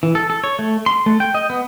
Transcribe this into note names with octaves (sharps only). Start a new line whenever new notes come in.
E3
A4
A4
C#5
A3
C6
A3
G5
D#5
B3